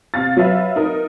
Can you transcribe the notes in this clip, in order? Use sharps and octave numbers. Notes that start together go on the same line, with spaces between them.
C3 F5 A6
F#3 B4 E5 F5
D#4 A#4